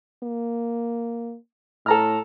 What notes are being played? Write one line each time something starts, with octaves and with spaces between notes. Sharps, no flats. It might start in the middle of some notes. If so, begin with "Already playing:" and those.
A#3
A2 A4 A#5 F6